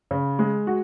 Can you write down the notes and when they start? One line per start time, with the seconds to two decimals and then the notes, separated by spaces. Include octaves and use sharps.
0.11 C#3
0.39 G#3
0.67 F#4